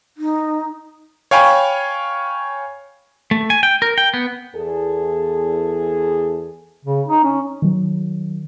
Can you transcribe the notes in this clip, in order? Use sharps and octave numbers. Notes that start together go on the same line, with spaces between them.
D#4
C#5 F5 G5 G#5 B5 C#6
A3
G#5
G5
A#4
G5
B3
E2 G#4 A4
C#3
D#4
C#4
D#3 F#3